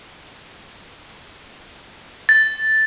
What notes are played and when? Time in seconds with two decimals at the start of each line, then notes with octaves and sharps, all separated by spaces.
2.29 A6